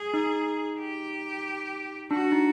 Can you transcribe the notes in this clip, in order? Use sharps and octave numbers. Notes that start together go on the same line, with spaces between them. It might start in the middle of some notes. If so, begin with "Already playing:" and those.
Already playing: G#4
D#4
G4
D4 F#4
D#4